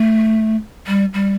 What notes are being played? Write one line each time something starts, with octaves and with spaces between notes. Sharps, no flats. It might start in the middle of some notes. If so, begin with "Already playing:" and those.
Already playing: A3
G3
G3